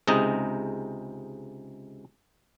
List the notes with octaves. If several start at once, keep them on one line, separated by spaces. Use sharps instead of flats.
C#2 C3 G#3 D#4 D#5 A#5